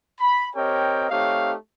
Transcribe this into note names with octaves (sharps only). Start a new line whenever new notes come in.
B5
C4 G4 A#4 C#5 D#5 G5
A3 C4 D#4 G4 C#5 F5